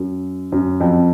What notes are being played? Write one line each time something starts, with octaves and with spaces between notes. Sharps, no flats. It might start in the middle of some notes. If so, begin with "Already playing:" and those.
Already playing: F#2
F#2
F2